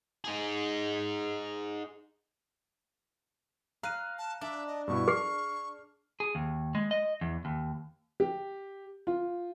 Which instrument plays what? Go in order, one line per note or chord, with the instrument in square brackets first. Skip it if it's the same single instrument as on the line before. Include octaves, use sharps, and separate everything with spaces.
[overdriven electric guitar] D#4 G#4
[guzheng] F5 [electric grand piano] A#5 F#6 D#7
[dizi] A5
[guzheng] D4 [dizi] E5
[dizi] D#5
[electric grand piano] G2 B2 E4 [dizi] C#6
[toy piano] G#4 [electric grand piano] F6 C7
[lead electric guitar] G#4
D#2
G#3
D#5
E2
D#2
[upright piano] G4
F4